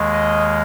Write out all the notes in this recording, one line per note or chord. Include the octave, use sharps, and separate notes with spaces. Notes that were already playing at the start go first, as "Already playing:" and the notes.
Already playing: D#2 D#3 G#3
D#5